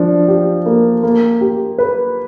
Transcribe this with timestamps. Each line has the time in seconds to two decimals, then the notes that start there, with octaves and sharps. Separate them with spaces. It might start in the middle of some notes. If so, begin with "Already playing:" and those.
Already playing: F3 D4
0.28 G4
0.66 A#3
1.03 A#3
1.41 G4
1.78 B4